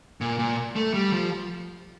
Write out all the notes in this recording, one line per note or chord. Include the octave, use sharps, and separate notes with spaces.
A#2
A#2
A3
G3
F3